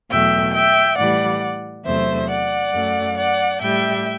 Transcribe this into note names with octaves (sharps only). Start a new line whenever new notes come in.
E2 B2 F#3 A3 E5 G5
E5 G5
A2 E3 G3 D5 F#5
E2 C3 F#3 A3 C5 E5
D5 F#5
F#2 F#3 A3
D5 F#5
A2 G3 E5 G5